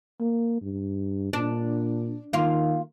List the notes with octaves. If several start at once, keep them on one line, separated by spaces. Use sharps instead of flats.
A#3
G2
A#2 D4
D#3 A#3 F4